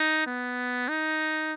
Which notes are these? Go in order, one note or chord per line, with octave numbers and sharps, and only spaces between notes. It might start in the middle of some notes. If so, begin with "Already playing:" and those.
Already playing: D#4
B3
D#4